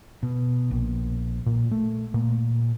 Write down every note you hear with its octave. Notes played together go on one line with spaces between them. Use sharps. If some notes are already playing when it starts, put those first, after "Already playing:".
B2
A#1
A#2
A3
A#2